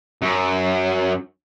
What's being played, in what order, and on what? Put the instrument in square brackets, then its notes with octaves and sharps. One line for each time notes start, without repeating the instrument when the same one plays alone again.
[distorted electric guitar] F#2